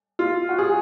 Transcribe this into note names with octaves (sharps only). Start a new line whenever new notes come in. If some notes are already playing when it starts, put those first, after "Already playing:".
F4
F#4
G#4